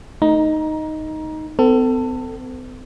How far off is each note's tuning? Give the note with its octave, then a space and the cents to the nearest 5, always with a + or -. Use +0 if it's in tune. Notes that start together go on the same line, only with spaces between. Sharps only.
A3 +0 D#4 +0 A#5 +20
C4 -45 A4 +20